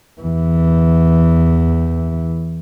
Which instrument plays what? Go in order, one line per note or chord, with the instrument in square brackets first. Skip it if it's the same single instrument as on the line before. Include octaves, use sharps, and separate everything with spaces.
[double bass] E2 E3